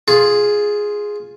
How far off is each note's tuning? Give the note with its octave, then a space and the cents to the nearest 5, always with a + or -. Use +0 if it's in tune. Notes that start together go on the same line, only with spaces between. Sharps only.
F4 +0 G#4 +0